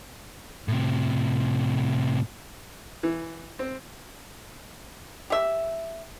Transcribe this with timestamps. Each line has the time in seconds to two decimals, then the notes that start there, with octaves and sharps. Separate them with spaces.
0.68 A2 C3
3.03 E3
3.59 C4
5.30 G4 E5